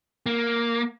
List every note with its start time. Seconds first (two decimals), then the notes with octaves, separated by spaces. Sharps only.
0.26 A#3